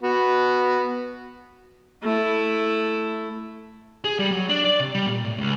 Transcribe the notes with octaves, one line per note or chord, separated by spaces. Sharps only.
B3 F#4
A3 E4
G#4
G3
F#3
D4
D5
C3
G3
A#2
A2
C#2